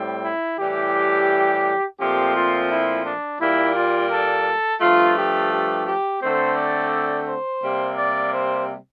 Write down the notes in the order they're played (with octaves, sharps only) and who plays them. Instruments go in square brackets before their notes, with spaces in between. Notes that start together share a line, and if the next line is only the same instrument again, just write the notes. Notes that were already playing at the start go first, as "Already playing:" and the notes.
Already playing: [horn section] A2 G3 C4
E4
A2 E3 G3 G4
A#2 F3 A3 C4 G4
F4
E4
D4
A#2 G3 A#3 E4
F4
A4
G2 F3 A3 F4
G4
G4
G4
D3 A3 C4 C5
D5
C5
C3 G3 A#3
D5
C5